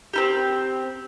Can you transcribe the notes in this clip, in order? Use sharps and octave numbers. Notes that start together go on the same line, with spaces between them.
C4 E4 G4